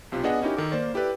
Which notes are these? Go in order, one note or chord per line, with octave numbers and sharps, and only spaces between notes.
B1 C3 F4
B3 D4 G#4 D#5 F#5
C#4 D#4 E4 F#4 G4 A#4
D#3 A4 D6
A#3 C5 D5
E4 G4 A4 B4 D5